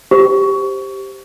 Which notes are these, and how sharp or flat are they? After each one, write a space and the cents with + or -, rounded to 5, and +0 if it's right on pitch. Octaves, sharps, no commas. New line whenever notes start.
G4 +0 C5 +0 C#6 +20